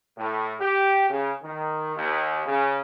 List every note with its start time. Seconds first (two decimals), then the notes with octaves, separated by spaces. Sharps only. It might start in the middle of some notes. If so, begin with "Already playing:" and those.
0.17 A2
0.59 G4
1.10 C#3
1.43 D#3
1.96 D#2
2.47 C#3